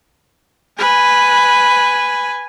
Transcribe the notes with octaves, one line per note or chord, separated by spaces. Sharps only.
B4 G#5